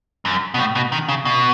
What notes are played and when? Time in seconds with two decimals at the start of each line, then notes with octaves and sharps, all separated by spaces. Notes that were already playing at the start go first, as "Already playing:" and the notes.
0.25 F#2
0.54 B2
0.59 A2
0.75 B2
0.92 D#3
1.08 C#3
1.25 B2